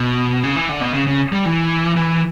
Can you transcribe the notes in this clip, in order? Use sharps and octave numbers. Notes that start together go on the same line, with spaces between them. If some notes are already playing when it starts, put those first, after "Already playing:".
Already playing: B2
C#3
E3
D3
B2
C#3
C#3
G3
E3
E3